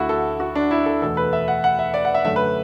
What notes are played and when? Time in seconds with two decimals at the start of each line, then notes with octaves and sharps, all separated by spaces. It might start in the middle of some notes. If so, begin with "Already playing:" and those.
Already playing: D2 D3 A3 E4 F#4
0.09 A4
0.40 F#4
0.55 D4
0.71 E4
0.86 A4
1.01 E2 B2 A3 A4
1.17 B4
1.33 E5
1.48 F#5
1.64 F#5
1.79 E5
1.94 D5
2.05 F#5
2.14 E5
2.25 F#2 D3 A3 E5
2.36 B4